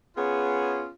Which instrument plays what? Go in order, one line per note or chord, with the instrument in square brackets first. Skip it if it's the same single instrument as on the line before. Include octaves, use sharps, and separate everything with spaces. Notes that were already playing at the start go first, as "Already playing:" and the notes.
[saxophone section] B3 C#4 F4 G#4